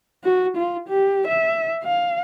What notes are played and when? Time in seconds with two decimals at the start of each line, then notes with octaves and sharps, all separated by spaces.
0.24 F#4
0.57 F4
0.89 G4
1.28 E5
1.84 F5